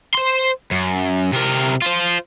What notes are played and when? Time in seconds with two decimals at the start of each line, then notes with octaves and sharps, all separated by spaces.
0.15 C5 C6
0.71 F#2
1.33 C3 A#4
1.82 F4 C5